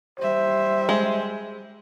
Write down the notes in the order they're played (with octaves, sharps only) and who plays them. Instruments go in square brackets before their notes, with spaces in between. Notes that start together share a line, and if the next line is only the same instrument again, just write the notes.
[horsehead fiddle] G3 E5 [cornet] C5
[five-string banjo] G#3